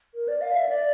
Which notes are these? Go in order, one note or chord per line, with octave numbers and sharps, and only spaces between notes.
A#4
D5
F5
E5
D5